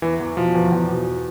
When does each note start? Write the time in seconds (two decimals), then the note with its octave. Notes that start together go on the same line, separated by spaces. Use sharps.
0.02 E2 E3
0.20 E2
0.37 B2 F3
0.54 E2
0.72 E2
0.89 B2